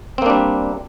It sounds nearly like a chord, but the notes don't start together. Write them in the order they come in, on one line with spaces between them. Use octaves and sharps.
C4 A#3 D4 G3